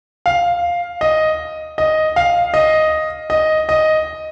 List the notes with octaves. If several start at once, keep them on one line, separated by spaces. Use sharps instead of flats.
F5
D#5
D#5
F5
D#5
D#5
D#5